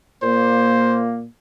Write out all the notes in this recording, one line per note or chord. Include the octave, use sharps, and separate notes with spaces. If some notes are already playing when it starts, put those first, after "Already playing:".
A#2 A#3 C5